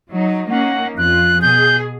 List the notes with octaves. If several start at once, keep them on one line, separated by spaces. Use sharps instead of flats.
F#3 D#4
A#3 C#4 D#4 F#5
F2 F4 F#6
B2 G#4 G6